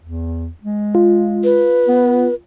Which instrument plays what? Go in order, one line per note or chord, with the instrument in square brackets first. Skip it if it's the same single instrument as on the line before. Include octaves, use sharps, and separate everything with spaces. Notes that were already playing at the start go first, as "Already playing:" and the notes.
[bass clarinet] E2
G#3
[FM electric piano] F4
[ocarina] B4
[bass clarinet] B3